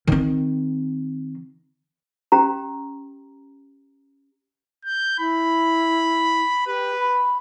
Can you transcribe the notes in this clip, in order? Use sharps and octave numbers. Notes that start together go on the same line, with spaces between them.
D#3 C4
C#4 G4 A#5
G6
E4 B5
G4 B4
B5